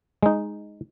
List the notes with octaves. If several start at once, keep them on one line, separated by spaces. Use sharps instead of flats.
G#3 D#4